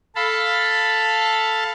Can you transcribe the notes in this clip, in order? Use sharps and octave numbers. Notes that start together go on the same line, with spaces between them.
A4 F5 A5 B5